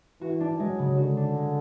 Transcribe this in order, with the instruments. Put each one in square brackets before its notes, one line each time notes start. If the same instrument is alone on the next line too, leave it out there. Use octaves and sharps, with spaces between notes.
[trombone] E3 [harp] F#4
[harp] D4
[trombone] F#3 [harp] G#3
[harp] C#3
[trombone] D3 [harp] F#4
[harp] D4
G#3